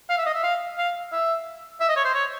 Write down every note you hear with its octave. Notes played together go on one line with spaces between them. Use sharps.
F5
E5
D#5
E5
F5
F5
E5
E5
D#5
C#5
C5
C#5